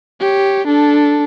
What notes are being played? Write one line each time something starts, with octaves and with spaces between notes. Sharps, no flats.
G4 C#5
D4 A4